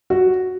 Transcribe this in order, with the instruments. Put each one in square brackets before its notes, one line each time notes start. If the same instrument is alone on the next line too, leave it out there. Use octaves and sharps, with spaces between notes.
[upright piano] F#4